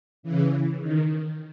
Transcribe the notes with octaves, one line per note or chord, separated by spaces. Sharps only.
C#3 E3
D#3